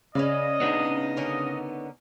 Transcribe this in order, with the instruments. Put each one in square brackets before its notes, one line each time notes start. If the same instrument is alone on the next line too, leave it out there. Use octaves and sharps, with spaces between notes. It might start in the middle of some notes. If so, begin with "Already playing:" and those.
[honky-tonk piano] C#3 [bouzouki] C#4 B4 D5 [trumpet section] D#5
[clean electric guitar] B3 D4 D#4
[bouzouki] D3 C#4 A#4